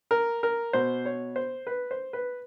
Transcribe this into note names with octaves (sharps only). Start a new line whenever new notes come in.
A#4
A#4
B2 C5
C#5
C5
B4
C5
B4